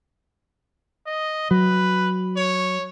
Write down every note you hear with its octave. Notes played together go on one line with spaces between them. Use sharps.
D#5
F#3 B4
C#5